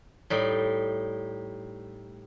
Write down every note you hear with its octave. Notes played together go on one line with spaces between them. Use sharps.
A2 G3 D#4